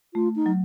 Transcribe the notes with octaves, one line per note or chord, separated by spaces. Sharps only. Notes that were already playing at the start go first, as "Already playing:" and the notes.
A3 F4
D#4
F#3